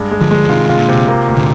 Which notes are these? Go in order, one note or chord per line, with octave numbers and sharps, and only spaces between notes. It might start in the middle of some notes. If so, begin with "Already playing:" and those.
Already playing: G2 G#3
G#3
D3 F3
G#3
F3
C3 D#3 F4
C3 F4
A#2 D3
C3
A#3
D2
A#2 D3